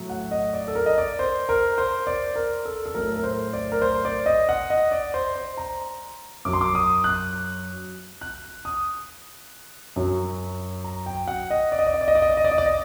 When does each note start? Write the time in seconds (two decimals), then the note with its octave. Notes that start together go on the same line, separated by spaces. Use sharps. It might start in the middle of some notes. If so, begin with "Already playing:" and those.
Already playing: A2 F#3
0.10 F#5
0.31 D#5
0.54 D5
0.68 A4
0.75 A#4
0.86 D#5
0.98 D5
1.19 C5
1.49 A#4
1.78 C5
2.07 D5
2.36 A#4
2.65 A4
2.86 A4
2.95 A2 F#3 A#4
3.16 A#4
3.24 C5
3.53 D5
3.72 A#4
3.82 C5
4.05 D5
4.26 D#5
4.49 F#5
4.70 D#5
4.92 D5
5.14 C5
5.36 C5
5.57 A#5
6.45 F#2 D6
6.49 F#3 C6
6.61 D6
6.75 D#6
7.04 F#6
8.21 F#6
8.65 D#6
9.96 F#2 F#3
10.84 A#5
11.06 G5
11.28 F#5
11.50 D#5
11.72 D5
11.79 D#5
11.87 D5
11.94 D#5
12.01 D5
12.08 D#5
12.15 D5
12.22 D#5
12.30 D5
12.37 D#5
12.45 D5
12.51 D#5
12.58 D5
12.66 D#5